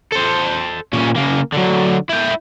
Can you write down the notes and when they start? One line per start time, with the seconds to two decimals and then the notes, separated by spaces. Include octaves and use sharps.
0.12 A4 C5
0.93 A#2 C#4
1.16 C#3 A#3
1.52 D3 F#3
2.09 E4 G5